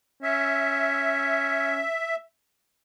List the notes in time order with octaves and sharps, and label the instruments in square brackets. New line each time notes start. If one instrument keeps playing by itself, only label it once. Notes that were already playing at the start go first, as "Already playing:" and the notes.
[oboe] C#4 [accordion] E5